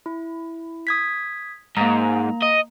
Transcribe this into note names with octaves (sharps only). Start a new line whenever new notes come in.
E4
D#6 G#6 B6
G#2 A#3 A#5
D#5